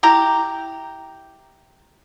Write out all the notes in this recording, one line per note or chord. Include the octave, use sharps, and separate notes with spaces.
E4 G4 A#5